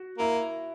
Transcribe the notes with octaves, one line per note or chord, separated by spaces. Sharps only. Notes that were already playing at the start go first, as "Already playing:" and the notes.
Already playing: F#4
A#3 E4